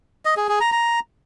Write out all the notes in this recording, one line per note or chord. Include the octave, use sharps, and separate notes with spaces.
D#5
G#4
G#4
A#5
A#5